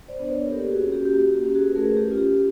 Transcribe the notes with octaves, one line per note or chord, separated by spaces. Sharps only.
C5 D5
B3 D4
B4 C#5
A#4
A#3 G4 A4
F#4 G#4
C#4 F#4
G4
G4
A#3 F#4
G4
C#4 F#4 G4
F#4 G#4
B4
A3 G#4 A#4
G4
C#4 F4
G4